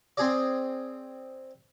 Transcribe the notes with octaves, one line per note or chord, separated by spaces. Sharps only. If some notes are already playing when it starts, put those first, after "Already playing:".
C4 G#4 D5